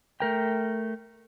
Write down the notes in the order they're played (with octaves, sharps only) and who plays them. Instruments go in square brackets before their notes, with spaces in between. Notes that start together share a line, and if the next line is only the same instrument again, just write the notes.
[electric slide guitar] A3 A#4 G5